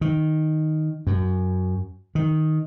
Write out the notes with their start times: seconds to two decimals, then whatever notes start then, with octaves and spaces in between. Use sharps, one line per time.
0.01 D#3
1.07 F#2
2.15 D#3